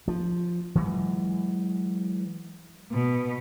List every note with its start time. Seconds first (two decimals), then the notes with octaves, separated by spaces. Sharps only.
0.08 F3
0.75 E3 F#3 G#3
2.92 B2